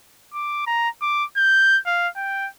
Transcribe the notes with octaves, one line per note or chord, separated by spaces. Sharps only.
D6
A#5
D6
G6
F5
G5